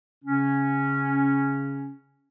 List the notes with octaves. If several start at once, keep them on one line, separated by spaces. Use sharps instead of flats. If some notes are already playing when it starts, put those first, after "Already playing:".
C#3 C#4